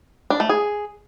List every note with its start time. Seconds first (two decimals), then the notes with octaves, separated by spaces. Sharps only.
0.30 D4
0.40 A3
0.49 G#4